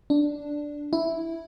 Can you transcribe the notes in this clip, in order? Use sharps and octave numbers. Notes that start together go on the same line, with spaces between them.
D4
E4